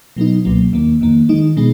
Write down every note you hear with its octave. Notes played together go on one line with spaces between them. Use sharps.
B2 F#3 B3 D#4
C#2 B2 F#3 A#3
D#2 D#3 A#3
F2 D#3 A#3
D#3 G#3 D#4
B2 G#3 B3 D#4